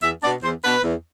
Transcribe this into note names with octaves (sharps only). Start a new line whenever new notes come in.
E2 E5
B2 B3 D4 D5
E2 C5
B2 B3 D4 B4
E2